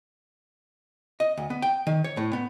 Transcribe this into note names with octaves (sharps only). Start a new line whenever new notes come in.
D#5
D2
B3
G5
D#3
C#5
A2
B3